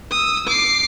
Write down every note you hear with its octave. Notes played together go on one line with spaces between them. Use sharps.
D#6 E6
D6 C7